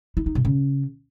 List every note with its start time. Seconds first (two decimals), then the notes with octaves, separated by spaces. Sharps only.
0.17 E4
0.26 D#4
0.35 C3
0.45 C#3